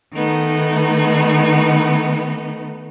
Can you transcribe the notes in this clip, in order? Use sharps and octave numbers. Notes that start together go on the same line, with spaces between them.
D#3 A3 B3 D#4